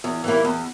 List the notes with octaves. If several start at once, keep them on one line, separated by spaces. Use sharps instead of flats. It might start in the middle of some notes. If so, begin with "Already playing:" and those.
E2
E3 G3 A#3 E4
E2